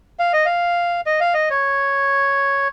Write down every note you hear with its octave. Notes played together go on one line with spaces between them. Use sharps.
F5
D#5
F5
D#5
F5
D#5
C#5